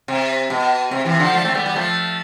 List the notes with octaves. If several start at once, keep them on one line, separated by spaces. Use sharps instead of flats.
C3
B2
C3
C3 E3
D3 F3
F3 A3
A3 C4
G3 B3
G3 B3
F3 A3